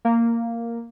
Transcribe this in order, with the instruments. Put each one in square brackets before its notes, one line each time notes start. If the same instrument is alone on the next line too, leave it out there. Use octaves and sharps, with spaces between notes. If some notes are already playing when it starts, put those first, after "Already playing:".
[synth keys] A#3